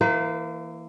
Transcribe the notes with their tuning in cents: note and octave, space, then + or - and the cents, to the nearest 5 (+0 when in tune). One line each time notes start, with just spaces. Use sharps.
E3 +0 A#3 -5 C5 -45